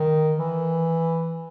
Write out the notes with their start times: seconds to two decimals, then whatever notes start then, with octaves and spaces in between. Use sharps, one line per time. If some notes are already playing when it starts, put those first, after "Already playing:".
Already playing: D#3
0.38 E3